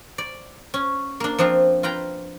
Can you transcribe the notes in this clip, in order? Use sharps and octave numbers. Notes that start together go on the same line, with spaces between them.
D5
C#4
A#3 D4
F3 C4 D4 F4
F4 B4 G5 A#5